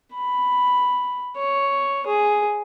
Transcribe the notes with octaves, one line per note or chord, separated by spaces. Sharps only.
B5
C#5
G#4